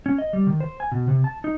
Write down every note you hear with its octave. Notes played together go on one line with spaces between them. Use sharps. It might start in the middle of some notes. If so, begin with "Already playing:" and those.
C#4
D#5
G3
D#3
C5
G#5
B2
C3
A5
D#4